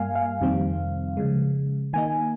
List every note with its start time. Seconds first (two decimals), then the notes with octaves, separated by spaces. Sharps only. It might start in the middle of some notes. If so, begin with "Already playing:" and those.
Already playing: G2 G3 A#3 F5 G#5
0.15 F5
0.41 F2 C3 D#3 G3 C4
1.17 C#3 F3 G#3
1.93 D#3 A#3 D#4 G#5